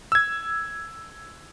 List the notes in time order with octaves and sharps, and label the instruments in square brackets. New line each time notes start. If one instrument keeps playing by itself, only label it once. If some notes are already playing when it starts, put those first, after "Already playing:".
[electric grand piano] E6 G#6